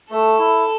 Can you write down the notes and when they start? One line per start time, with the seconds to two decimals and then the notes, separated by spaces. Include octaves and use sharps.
0.11 A3 A4
0.38 E4